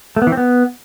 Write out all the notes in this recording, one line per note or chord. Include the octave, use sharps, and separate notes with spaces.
A3
B3
E3
C4
B3